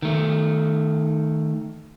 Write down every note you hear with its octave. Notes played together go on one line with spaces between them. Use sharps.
D#3 A3